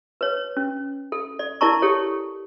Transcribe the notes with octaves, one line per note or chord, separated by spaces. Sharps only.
B4 C#5
C#4
A4
D5
E4 A#4 D5 A5 A#5 C#6
G4 A4 C#5